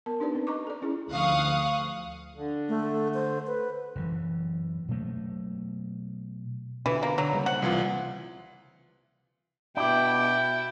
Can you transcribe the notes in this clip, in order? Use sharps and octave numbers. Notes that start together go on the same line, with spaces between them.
B3 A#4 A5
D4 D#4 G4 B4 D5
C4
D#5 A#5 C#6 D6
A4 D5
C#4 E4 G#4
D2 F3 F5 C#6 D#6 F#6
D3
A3
C5
B4
F#1 C#3 E3
B2 F#3 A3 A#3
B2 D3 E3 B5
A#3
D3 F#3
C#3 G3 A#3
C5 F#5
C2 E3 F4
B2 D4 E4 G4 G5